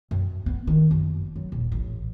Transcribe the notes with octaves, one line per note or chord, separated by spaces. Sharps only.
F#2
B3
D#3
F#1
F#3
D#1
A1